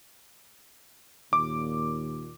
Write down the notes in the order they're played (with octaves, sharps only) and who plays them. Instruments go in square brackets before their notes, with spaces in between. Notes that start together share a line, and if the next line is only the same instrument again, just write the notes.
[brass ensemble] D#2 A#2 [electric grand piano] D6